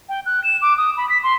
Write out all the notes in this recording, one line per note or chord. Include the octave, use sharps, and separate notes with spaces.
G5
F#6
E7
D6
D#6
B5
B6
C6